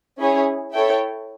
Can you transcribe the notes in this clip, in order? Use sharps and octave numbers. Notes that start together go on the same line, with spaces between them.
C#4 E4 G#4 C#5
E4 A4 C#5 E5 G5